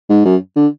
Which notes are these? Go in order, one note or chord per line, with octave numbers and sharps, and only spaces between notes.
G#2
F#2
D3